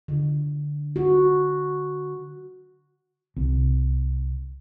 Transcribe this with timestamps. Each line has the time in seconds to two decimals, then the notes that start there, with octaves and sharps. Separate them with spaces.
0.08 D3
0.96 F#4
3.36 C2